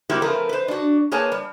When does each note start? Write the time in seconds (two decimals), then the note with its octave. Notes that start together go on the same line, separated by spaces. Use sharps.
0.10 G3 A#3 C4 E4 F#4 G4
0.22 F3 A3 C4 A#4 B4
0.49 B4 C5
0.68 D4 F#4
1.12 A#3 G#4 B4 C#5 G#5 A5
1.32 G3